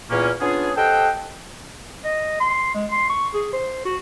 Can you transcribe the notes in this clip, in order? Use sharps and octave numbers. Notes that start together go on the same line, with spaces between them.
E2 A#2 A#3 C#4
B3 C#4 D4 F4 G#4
G4 A4 C5 D#5 F#5 G5
D#5
C6
G#3
C6
C#6
G#4
C5
F#4